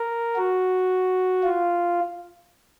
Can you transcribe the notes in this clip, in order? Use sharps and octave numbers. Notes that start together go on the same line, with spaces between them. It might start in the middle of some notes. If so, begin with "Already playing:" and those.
Already playing: A#4
F#4
F4